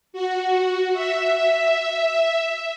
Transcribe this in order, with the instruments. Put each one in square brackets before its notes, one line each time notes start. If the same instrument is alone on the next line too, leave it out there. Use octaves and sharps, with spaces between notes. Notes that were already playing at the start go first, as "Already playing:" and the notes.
[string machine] F#4
E5